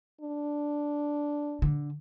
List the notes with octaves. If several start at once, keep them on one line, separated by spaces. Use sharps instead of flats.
D4
D3